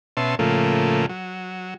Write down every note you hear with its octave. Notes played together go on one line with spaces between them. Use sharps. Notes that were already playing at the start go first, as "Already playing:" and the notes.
B2 C#4 E5 A5 C6
A2 C#3 F3 A3 A#3
F#3